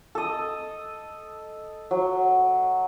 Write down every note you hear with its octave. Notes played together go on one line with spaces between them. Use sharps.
A4 D#5
F#3